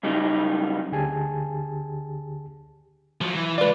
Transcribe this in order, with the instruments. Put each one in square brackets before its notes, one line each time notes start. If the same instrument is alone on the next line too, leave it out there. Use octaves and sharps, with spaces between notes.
[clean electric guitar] F#2 C#3 G3 D#4
[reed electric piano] D2 D3 G4 G#4 G#5 A5
[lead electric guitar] F3 F#3
E3
[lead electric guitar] G#3 F4 [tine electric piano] B4 D5